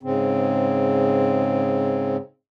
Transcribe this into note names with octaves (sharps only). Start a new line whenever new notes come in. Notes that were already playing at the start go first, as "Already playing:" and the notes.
G#2 C#3 C4